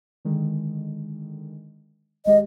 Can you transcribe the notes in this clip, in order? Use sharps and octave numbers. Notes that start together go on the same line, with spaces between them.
D3 D#3 G#3
G#1 G#3 G4 D#5